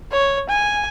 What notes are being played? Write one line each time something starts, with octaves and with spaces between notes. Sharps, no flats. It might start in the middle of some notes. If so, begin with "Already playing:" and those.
C#5
G#5